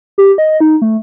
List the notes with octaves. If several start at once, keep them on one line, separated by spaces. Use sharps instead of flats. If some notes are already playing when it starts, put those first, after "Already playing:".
G4
D#5
D#4
A3